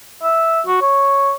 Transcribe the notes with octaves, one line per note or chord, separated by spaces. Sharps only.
E5
F#4
C#5